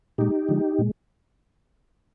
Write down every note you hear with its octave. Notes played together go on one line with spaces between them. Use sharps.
A#2 G#3 D#4 G4
D3 F3 G#3
A#2 G#3